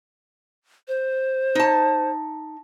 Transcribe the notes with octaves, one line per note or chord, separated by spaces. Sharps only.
C5
D#4 A5